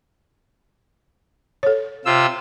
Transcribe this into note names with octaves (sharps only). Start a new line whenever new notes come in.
A4 C#5
C3 F4 E6